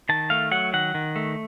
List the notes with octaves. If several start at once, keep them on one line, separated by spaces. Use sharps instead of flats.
D#3 A5
A3 F5
F#3 F#5
D#3 F#5
D#3
A3